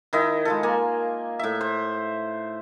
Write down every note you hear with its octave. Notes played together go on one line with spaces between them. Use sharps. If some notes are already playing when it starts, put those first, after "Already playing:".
D#3 E4 D#5 G5
G#3 F4 A4
A#3 G#5
A2 E5
C5